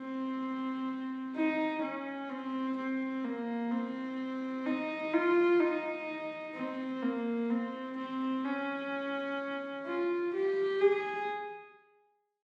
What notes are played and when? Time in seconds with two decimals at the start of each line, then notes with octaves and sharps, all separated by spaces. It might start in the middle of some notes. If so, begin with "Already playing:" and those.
Already playing: C4
1.35 D#4
1.82 C#4
2.29 C4
2.76 C4
3.24 A#3
3.71 C4
4.66 D#4
5.13 F4
5.60 D#4
6.54 C4
7.02 A#3
7.50 C4
7.97 C4
8.45 C#4
9.86 F4
10.34 G4
10.80 G#4